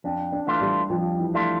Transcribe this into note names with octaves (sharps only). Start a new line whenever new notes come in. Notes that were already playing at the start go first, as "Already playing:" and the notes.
F2 D4
D4
E3 A3 D4 F4
G3
F2 F3
E3
E3 A3 D4 F4